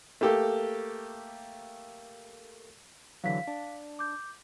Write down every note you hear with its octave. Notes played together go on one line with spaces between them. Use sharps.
A3 A#3 G4 A4
D3 E3 F#3 F5 B6
D4
D6 G6